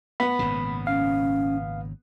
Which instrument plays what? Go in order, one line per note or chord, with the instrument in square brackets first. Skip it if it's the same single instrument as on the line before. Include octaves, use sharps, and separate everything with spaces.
[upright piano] B3 [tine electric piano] B5
[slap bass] G#1 A#2 C#3
[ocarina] C#4 [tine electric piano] F5